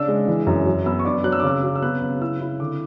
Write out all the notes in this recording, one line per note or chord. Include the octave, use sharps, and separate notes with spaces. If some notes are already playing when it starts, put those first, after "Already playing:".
Already playing: C#3 D4 E6
G#3
E3
F#2
F#3
B3 E6
C#6
D4 D6
F#3 F#6
E6
D6
C#3 E6
F#3
E6
B3 F#6
C#3
E4 E6
E4
D3 D6